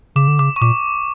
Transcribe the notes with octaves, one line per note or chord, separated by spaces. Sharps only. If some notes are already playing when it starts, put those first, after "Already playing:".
C#3 D6
D3
C#3 D6
C#6
A#2 D6